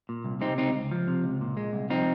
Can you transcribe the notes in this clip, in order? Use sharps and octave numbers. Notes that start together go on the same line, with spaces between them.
A#2
C2
C3 C4 D#4
C#2 C4 D#4
C#2
F3
C3
C#2
A#2
G#3
C2
F3 C4 D#4